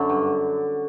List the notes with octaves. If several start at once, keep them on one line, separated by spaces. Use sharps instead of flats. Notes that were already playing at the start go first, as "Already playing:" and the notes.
Already playing: F#2 D3
G2